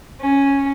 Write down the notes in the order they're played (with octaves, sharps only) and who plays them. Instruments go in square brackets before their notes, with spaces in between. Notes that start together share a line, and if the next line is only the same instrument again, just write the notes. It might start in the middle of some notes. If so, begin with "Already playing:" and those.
[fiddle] C#4